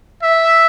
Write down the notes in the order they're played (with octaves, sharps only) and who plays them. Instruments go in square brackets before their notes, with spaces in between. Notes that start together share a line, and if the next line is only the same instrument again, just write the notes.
[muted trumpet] E5